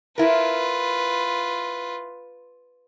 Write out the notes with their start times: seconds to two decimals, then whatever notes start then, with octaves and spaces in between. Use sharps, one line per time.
0.18 E4 F4 A#4 B4